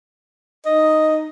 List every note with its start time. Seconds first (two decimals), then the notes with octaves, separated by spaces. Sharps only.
0.66 D#4 D#5